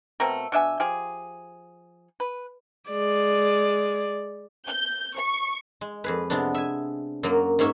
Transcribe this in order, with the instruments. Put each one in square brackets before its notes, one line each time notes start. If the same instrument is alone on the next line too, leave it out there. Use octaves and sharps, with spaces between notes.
[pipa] B2 A3 C4 A#4
B2 D4 E5 G#5
F3 G4 G#4
B4
[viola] G#3 D5
[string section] G6
C#6
[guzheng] G#3
F2 G#4 B4
C3 G#3 B3 D4
E5 G#5
F#2 F#3 A#3
G#2 A#3 C#4 E5